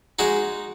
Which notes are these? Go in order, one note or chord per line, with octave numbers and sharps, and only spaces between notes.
G#3 D#4 F#4